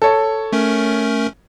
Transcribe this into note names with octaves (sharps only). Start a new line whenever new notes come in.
A4 C#5
A3 C#4 A#4